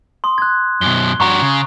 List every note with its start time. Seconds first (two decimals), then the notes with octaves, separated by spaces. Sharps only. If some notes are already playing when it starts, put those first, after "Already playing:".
0.24 C6 D#6
0.38 F#6 G#6
0.81 F#2 B2 G7
1.20 G2 F#4 A#5 C#6
1.42 C#3